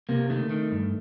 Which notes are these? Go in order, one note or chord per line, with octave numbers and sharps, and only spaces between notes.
C3 A#3
D#3 A3
D#3
G2